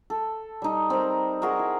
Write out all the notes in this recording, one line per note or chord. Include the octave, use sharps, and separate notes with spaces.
A4
G3 D#4
C4 A#4
D#4 F#4 G#4 A#4
E4